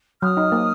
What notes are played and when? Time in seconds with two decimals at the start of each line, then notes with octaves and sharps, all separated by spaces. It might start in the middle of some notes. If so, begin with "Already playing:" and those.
0.22 F#3 D#6 F6
0.37 D#4
0.52 A#3